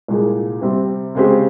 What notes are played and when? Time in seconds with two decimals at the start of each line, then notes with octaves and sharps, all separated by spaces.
0.08 C2 A#2 G#3
0.62 C3 G3 C4
1.15 C#3 G#3 C4 G4